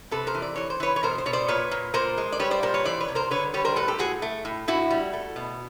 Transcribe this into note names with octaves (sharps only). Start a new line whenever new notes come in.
C3 A4 B4
A#4 C5
E3
D5
E3 C#5
C5
E3 B4 C#5
C#5
B2 A#4 C5
C5
B2 C#5
C5 D5
A#2 B4 C#5
A#2
A#2 A#4 C5
G#3
D5
G3 B4 C#5
C5 D5
A#2 A#4 C5
B4 C#5
E3 C5 D5
B4 C#5
C3
A#4 C5
D3 B4 C#5
G3 B4 C#5
A#4 C5
A2 A4 B4
G4 A4
A2 F#4 G#4
A3
A2
A2 E4 F#4
G3
A3
B2